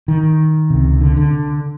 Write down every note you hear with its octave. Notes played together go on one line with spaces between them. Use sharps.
D#3
C#2 C3
D3
D3